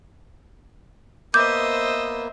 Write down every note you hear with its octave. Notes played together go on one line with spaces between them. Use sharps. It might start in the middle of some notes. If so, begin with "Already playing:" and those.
A#3 B3 C5 D#5 E5 D6 G6